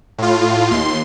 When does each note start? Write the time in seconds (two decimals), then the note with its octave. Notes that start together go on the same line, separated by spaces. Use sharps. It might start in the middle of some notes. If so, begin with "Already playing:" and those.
0.18 A2 F4
0.71 D#2 C6